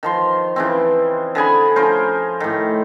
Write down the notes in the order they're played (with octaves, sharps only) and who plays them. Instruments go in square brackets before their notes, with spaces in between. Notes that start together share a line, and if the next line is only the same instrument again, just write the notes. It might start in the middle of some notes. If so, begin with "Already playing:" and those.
[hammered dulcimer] D#3 F3 C6
C#3 E3 C4
D3 G#4 G#5 B5
F3 C#4 A#4 C5
A2 D#3